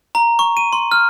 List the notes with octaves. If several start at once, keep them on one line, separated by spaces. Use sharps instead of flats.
A#5
C#6
D#7
C6
F6